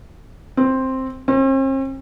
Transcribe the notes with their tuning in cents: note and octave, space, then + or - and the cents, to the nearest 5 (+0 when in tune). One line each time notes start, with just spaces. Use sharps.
C4 +5
C4 +45